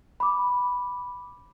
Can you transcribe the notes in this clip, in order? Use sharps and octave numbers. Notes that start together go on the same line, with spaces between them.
B5 D6